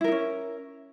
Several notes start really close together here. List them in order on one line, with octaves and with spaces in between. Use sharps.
E4 A#4 D#4 C#4